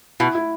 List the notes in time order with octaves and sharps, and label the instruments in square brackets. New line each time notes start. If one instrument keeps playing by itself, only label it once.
[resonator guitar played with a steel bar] B2 [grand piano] E4
[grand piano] E4